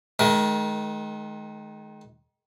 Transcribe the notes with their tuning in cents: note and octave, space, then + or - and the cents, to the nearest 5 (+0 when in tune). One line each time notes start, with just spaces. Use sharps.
D#3 +0 G#3 +45 A#4 +35